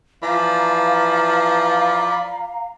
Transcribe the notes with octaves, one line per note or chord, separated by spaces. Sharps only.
E3 F3 D5 F5 A#5 B5